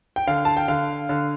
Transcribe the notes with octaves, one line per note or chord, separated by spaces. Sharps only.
G5
D3 F5
A5
G5
D3 F5
D3